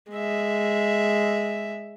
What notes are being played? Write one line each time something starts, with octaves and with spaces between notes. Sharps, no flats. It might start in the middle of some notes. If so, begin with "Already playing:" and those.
G#3 E5